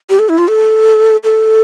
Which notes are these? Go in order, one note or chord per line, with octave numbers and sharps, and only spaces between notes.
G4
A4
E4
F4
A4
A4